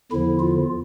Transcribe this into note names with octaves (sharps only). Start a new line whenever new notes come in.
E2 D3 F3 E4
F4